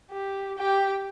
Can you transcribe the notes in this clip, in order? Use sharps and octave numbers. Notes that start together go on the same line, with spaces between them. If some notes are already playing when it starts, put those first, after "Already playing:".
G4
G4 G5